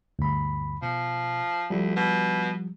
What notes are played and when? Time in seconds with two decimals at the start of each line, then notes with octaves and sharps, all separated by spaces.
0.19 D2 G2 B5
0.82 B2 F3
1.70 D2 F3 G3
1.96 B2